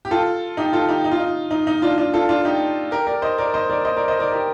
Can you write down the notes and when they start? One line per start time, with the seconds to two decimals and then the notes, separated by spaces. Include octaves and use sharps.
0.05 G4
0.11 F4 A4
0.57 D#4 G4
0.73 F4 A4
0.89 D#4 G4
1.04 D#4
1.11 F4
1.20 D#4
1.51 D#4
1.67 D#4
1.82 D4 F4
1.98 D4 F4
2.14 F4 A4
2.29 D4 F4
2.45 D#4 G4
2.91 G4 A#4
3.07 A#4 D5
3.22 C5 D#5
3.38 A#4 D5
3.54 C5 D#5
3.70 A#4 D5
3.85 C5 D#5
3.96 A#4 D5
4.08 C5 D#5
4.19 A#4 D5
4.32 G4 A#4